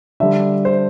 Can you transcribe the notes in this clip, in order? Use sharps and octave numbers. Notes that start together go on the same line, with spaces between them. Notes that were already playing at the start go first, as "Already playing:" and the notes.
D3 G3 E5
C5